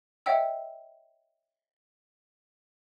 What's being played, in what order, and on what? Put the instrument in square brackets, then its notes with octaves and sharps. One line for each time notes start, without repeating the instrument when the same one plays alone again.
[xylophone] C#5 D#5 E5 F#5 G5 E6